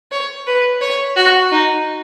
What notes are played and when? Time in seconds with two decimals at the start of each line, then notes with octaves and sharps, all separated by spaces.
0.11 C#5
0.47 B4
0.81 C#5
1.16 F#4
1.52 D#4